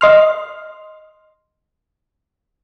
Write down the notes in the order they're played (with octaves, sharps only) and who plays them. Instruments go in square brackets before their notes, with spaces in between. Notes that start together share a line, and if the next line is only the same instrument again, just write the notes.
[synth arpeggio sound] D#5 C6 F6